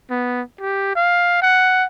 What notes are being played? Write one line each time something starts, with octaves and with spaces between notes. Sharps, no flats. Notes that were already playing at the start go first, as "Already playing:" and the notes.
B3
G4
F5
F#5